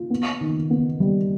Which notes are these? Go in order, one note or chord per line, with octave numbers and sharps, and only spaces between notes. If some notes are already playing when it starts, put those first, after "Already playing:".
Already playing: F4
B3
D#3
B3
G3